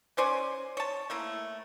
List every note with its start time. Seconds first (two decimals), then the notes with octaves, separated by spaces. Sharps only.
0.17 C#4 C5 D5 G#5
0.77 C#5 A5
1.10 A3 A#3 E4